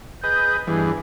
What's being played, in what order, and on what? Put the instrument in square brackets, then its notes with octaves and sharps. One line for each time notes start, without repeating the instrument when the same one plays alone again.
[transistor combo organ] G#4 B4 D#5 [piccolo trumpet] G6
[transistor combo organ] E2 G2 E3 [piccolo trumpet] G#4